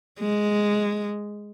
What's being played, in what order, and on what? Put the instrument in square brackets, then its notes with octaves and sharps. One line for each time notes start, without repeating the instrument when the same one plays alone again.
[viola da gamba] G#3